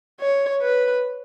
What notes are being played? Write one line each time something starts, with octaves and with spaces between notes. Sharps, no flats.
C#5
B4